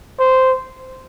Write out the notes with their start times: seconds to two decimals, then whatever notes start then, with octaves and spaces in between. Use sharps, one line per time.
0.19 C5